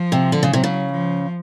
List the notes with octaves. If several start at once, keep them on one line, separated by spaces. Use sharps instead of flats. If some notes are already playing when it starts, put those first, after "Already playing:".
Already playing: F3
C3
D3
C#3
C3 F#3
C#3
F3